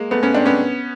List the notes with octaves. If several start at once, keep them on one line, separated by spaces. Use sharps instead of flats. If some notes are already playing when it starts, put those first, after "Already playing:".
Already playing: G#3 A#3
A3 B3
B3 C#4
C4 D4
B3 C#4